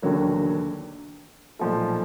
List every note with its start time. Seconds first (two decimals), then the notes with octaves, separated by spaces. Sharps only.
0.02 E1 D#2 D3 F#3 A#3
1.59 B1 A#2 F3 A3